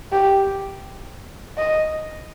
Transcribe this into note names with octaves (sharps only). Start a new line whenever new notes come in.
G4
D#5